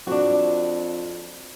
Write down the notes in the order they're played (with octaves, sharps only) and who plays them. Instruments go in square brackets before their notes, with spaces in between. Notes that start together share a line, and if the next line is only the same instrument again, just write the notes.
[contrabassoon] F2 [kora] D4 F#4